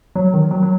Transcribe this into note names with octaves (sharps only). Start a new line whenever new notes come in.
F#3
D#3
F#3
F#3